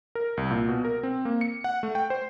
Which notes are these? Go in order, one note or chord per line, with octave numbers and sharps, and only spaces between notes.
A#4
C2
A#2
B2
A#4
C4
A#3
C#7
F#5
A3
G5
C5